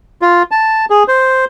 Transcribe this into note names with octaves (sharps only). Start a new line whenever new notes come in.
F4
A5
G#4
C5